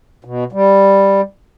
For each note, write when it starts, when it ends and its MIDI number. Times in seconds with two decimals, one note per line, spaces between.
0.25 0.44 47
0.52 1.21 55